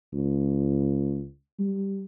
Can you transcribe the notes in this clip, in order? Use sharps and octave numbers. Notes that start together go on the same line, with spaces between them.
C#2
G3